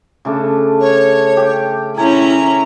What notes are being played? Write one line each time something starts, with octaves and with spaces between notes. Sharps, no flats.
C#3 A3 D4
C#5
G4 G5
C#4 E4 G#5 A#5